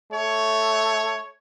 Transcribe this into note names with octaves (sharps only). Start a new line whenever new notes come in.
A3 C#5